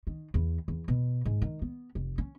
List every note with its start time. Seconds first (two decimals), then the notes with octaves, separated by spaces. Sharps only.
0.07 D#3
0.34 E2
0.68 E2
0.88 B2
1.25 G#2
1.42 D#3
1.62 B3
1.95 F1
2.18 C#4